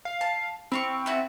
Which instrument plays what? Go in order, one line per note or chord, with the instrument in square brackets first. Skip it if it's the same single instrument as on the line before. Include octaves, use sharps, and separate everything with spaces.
[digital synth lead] F5
[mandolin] A5
[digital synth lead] C4 [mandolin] E4 F5 C#6
[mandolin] A3 E4 F#4